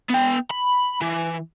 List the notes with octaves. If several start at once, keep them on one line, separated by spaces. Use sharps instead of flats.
B3 G5
B5
E3